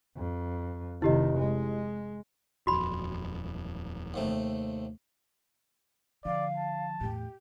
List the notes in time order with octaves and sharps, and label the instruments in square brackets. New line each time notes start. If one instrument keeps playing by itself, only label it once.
[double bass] F2
[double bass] F1 D#3 [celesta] E4 G4 D#5
[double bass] G#3
[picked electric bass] D#1 F2 [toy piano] F#4 B5
[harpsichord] D#2 C3 A3
[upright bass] D3 F3 [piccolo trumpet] D5 [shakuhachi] F5
[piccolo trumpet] A5
[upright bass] E2 A2 [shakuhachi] G4